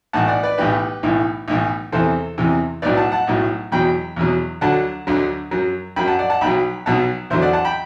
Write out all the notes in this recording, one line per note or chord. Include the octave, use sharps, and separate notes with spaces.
B1 A2 E3 F#5 A5
D5 F#5
B4 D5
B1 A2 E3 G4 B4
B1 A2 E3
B1 A2 E3
E2 C3 E3 A4 C5
E2 C3 E3
B1 A2 F#3 B4 D5
F#5 A5
F#5 A5
B1 A2 F#3
E2 B2 F#3 G5 B5
E2 B2 F#3
D2 D3 F#3 F#5 A5
D2 D3 F#3
F#2 F#3
F#2 F#3 G5 B5
F#5 A5
D5 F#5
F#5 A5
B1 B2 F#3 G5 B5
B1 B2 F#3 F#5 A5
E2 D3 F#3 C5 E5
D5 F#5
F#5 A5
G5 B5